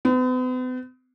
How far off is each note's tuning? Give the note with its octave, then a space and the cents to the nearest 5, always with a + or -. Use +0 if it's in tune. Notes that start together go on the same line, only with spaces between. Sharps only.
B3 +45